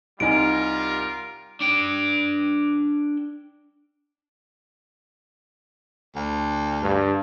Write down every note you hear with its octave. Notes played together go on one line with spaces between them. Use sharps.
C2 G3 D#4 F4 A#4 G#5 D7
D4 G5
D2
G2